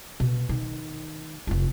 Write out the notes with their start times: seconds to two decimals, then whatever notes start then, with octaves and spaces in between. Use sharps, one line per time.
0.20 B2
0.49 D#3
1.47 F1 F4